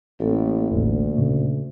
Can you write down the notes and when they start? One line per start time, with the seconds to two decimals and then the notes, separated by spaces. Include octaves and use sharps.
0.20 A1 A#3 A4
0.71 E1 A1 D2
1.17 A#2 C#3 A3